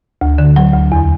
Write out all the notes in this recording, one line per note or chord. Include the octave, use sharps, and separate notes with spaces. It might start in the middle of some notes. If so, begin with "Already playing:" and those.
D2
D3
F#3
D2
E2